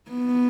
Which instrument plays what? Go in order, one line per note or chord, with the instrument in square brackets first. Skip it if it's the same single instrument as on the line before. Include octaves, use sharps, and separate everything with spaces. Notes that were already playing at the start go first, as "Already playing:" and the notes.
[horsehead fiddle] B3